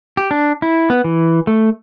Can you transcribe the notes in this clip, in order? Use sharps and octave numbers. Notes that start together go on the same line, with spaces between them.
G4
D4
E4
B3
E3
A3